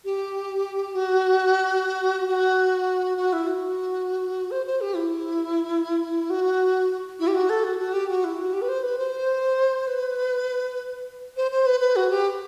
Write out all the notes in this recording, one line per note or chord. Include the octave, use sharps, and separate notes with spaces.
G4
F#4
F#4
F#4
E4
F#4
C5
C5
G4
E4
F#4
E4
G4
F#4
A4
F#4
F#4
G4
F#4
E4
F#4
G4
B4
C5
B4
C5
B4
C5
C5
B4
B4
F#4
G4